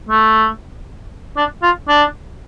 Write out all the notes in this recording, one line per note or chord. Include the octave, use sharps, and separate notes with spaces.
A3
D4
F4
D4